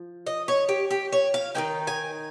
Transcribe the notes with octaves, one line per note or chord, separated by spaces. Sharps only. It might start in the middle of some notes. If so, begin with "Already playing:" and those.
Already playing: F3
D#5
C#5
G4
G4
C#5
F5
D#3 A#3 D#4 G5
G#5